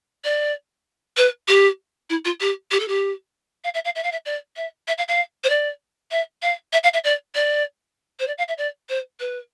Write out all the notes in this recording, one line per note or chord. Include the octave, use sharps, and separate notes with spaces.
D5
B4
G4
E4
F4
G4
G4
A4
G4
F5
E5
F5
E5
F5
E5
D5
E5
E5
F5
F5
C5
D5
E5
F5
E5
F5
E5
D5
D5
C5
D5
F5
E5
D5
C5
B4